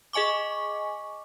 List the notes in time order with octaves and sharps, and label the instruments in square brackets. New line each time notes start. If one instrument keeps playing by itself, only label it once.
[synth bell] G#4 D#5 G#5 C#6 D6